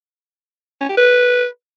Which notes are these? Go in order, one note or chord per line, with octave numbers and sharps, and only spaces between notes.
C#4
G4
B4